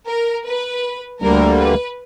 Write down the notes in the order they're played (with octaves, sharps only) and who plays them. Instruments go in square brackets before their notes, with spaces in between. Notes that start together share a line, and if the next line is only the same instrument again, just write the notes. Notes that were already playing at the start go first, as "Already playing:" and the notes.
[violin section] A#4
B4
[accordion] D2 D3 G3 A#3 [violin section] A#4
[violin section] B4